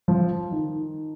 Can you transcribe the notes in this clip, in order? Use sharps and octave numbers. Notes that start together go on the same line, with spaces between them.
F3
D#3